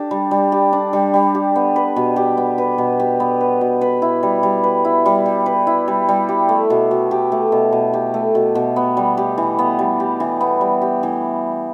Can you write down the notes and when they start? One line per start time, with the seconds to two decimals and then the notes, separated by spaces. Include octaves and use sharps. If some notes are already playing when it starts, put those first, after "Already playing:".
Already playing: D4 G4
0.11 G3
0.31 G3
0.52 G4
0.73 D4
0.93 G3
1.14 G3
1.35 G4
1.56 B3
1.76 B4
1.96 B2
2.16 G4
2.37 B3
2.58 B4
2.78 B2
3.00 G4
3.20 B3
3.41 B4
3.61 B2
3.81 B4
4.02 E4
4.23 G3
4.43 G3
4.64 B4
4.85 E4
5.06 G3
5.26 G3
5.46 B4
5.67 E4
5.88 G3
6.09 G3
6.29 G4
6.49 A3
6.70 B2
6.91 B2
7.11 G4
7.32 A3
7.52 B2
7.72 B2
7.93 G4
8.14 A3
8.35 B2
8.55 B2
8.76 B3
8.97 G3
9.17 G4
9.38 E3
9.59 B3
9.79 G3
10.00 G4
10.20 E3
10.41 B3
10.61 G3
10.82 G4
11.03 E3